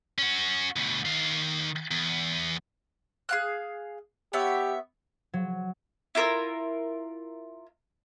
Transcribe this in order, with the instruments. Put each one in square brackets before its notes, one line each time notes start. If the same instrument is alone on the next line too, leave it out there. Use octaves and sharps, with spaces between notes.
[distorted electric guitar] C#4 F#4
D2 B2
D#3 F5
E2
[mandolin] G#4 F5 F#6
[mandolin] B3 C#5 E5 [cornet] G4
[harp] F#3
[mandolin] E4 F4 A#4 E6